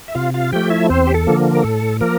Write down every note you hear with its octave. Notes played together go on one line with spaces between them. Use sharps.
E5
C3 F4 F5
F4 F5
F3 A3 G4 G5
E4 E5
E2 C4 C5
G4
A4
D3 F3 A#3
A#4
A2 A4
F3 A#3 A#4